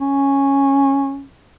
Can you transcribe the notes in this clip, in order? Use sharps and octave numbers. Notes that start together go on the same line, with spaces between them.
C#4